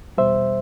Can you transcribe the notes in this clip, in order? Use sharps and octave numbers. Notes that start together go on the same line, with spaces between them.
E2 B2 G3 C5 E5